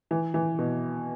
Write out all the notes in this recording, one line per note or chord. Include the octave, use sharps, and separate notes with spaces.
E3
E3
B2